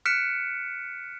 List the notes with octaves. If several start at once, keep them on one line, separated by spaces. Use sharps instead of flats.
F6 F#6 B6 C#7 D7 E7